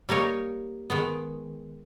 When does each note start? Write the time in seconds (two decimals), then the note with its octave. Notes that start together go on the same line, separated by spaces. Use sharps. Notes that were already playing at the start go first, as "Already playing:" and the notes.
0.09 G3 A#3 D#4 A#4 C#5
0.90 D#3 G#3 B3